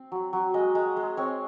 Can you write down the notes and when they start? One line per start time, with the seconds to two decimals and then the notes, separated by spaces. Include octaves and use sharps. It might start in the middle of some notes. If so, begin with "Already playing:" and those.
Already playing: C4
0.12 F#3
0.33 F#3
0.54 G#3 D#5
0.75 G#3
0.97 G#3
1.17 C4 C#5